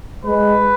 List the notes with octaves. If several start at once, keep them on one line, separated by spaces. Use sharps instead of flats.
G#3 B4